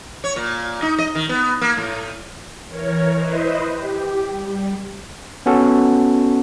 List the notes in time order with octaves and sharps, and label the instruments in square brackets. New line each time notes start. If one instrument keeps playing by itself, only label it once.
[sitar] C#5
A#2
D#4
D#5
D#3
B3
A#3
A2
[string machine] E3 A#4 C#5
E4 B4 C5 D#5
G4
G3
[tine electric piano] B3 C#4 F#4 A4